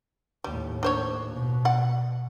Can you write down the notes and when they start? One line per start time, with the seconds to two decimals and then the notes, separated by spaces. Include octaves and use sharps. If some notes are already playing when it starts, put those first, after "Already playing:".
0.44 D#2 A2 G3
0.83 D4 C5 C#5
1.34 B2
1.65 D5 F#5